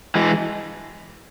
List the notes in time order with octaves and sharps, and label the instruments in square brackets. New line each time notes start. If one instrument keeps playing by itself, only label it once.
[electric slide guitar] E3 G#3